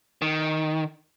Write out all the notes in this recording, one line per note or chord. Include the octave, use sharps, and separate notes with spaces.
D#3